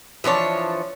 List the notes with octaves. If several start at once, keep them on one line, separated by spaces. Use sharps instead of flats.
E3 F3 D4 C#5